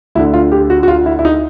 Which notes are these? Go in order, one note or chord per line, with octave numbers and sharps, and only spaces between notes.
D2 D3 E4
F4
G4
F#4
F#4
F4
E4
E4
D#4